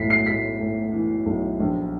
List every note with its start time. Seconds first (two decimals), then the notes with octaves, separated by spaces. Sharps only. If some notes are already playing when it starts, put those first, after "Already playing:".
Already playing: B1 A2 E3 B6 C7
0.10 C7
0.26 A2 B6
0.60 A2
0.93 E3
1.26 B1
1.60 A#1